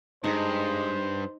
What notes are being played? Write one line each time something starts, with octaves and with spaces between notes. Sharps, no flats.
G2 G#3 D#4 C5